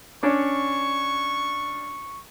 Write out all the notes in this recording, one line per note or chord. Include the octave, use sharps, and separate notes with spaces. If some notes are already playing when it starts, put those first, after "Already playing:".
C#4 D4 D5 C#6